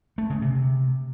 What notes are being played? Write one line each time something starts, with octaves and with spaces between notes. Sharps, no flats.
A3
C#3
C3